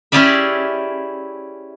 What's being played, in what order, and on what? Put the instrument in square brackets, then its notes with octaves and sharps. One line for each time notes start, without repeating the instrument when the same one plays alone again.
[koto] C#4 E4 G4 G#4 D5 E5